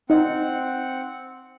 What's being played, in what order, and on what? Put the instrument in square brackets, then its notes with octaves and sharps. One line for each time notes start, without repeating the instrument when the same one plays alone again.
[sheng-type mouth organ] C4 F#5 [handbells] D#4 D#5